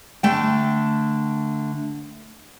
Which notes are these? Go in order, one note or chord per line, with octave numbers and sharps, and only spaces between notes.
D3 A3 G5